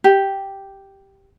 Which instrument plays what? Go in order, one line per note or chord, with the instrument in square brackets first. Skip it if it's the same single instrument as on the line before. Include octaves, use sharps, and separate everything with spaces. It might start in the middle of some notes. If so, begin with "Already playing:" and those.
[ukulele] G4